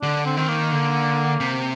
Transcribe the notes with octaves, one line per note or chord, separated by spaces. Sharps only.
D3 D4
C4
D#3 C4
A#3
D3
C3